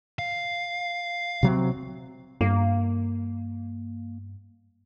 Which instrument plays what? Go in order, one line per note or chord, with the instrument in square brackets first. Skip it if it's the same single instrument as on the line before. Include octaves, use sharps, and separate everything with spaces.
[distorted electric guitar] F5
[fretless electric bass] C3 F#3 C4
[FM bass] G2 [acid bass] A#3